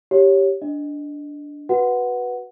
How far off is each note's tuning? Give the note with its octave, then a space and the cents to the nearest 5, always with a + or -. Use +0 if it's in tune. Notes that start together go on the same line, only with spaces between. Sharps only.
G4 +0 C#5 +0
D4 -10 D#5 +0
F#4 +0 B4 -5 F#5 +0